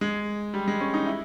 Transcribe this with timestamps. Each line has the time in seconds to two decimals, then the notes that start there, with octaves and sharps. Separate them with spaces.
0.01 G#3
0.54 G3
0.68 G#3
0.81 C#4
0.94 D#4
1.07 E4